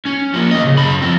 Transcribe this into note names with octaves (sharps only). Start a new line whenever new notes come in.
C#4
F3 A#3
D#2 D#5
C#3
F#2 B5
F3 C4